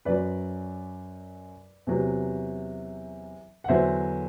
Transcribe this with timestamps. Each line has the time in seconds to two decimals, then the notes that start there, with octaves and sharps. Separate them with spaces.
0.05 F#2 F#3 B4 D5
1.87 E2 C3 F#3
3.64 F#5
3.68 E2 D3 F#3 C5 E5